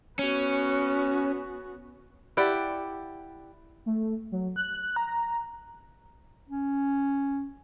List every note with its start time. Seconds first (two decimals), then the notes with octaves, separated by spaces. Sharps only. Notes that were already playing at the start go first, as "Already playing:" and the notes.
0.19 B3 C#4 F#4
2.37 E4 G4 D5 F#5
3.86 A3
4.32 F#3
4.56 F#6
4.96 A#5
6.49 C#4